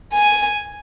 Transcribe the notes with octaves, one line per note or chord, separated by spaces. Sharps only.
G#5